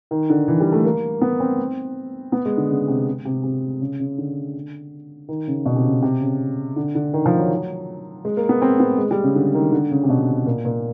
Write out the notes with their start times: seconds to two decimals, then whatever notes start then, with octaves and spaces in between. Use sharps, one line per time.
0.11 D#3
0.30 D3
0.48 E3
0.60 G3
0.72 A3
0.85 A#3
1.22 B3
1.40 C4
2.32 B3
2.46 G#3
2.57 D3
2.70 C#3
2.88 C3
3.25 C3
3.44 C3
3.81 C#3
4.00 C#3
4.18 D3
5.29 D#3
5.47 C#3
5.65 B2
5.76 C3
5.84 C#3
6.03 C3
6.21 C#3
6.76 D3
6.95 D3
7.14 D#3
7.26 F3
7.39 F#3
8.25 G#3
8.37 A#3
8.49 B3
8.62 C4
8.80 B3
8.98 G#3
9.11 G3
9.23 C#3
9.35 D3
9.54 D#3
9.73 D3
9.91 C#3
10.03 C3
10.09 B2
10.46 A#2
10.65 A#2